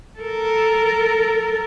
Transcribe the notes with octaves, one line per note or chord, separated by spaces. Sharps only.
A4 A#4